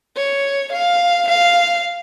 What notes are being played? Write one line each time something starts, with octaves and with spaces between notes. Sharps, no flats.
C#5
F5
F5